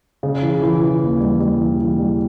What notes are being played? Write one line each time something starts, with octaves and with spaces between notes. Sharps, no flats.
C#3
E3
E3
E3
D#2
G3
G3
E3
E3
G3